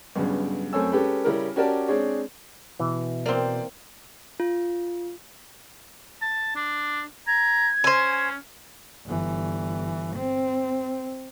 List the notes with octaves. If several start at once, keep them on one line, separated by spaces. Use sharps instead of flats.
B1 G2 C#3
F#2 A3 C4 C#5 G#5 E6
G#3 C#4 G4 A4 B4
C#3 G3 C#4 E4 G4 A#4
C#4 F#4 G4 A#4 D5 A5
G#3 C4 D4 G#4 C#5
B2 E3
A#3 C4 C5 D5
F4
A5
D4
A#5 G#6
C#4 C5 G#5
G1 E3
C4